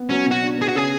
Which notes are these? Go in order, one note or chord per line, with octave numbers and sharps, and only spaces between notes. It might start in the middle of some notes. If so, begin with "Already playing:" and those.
Already playing: B3
F#3 C#4
B2 F#4
D4
B3 G#4
F#4
C#3 G#4